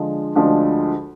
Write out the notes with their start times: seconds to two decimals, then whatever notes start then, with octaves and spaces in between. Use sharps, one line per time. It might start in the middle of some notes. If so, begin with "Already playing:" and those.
Already playing: D3 F3 G#3 D4
0.35 D2 D3 F3 G#3 D4